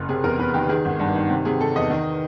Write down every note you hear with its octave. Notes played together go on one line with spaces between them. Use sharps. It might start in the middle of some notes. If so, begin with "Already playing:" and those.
Already playing: F#1
C3 G#4
E2 A#4
E2 B4
D#3 G4
D#3 G#4
G#1
G2
D#3
C3
C3 G#4
C3 A4
E2 D#5
D#3